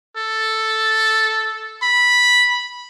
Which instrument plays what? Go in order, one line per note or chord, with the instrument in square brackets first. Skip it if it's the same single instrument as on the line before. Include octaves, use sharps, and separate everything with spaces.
[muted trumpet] A4
B5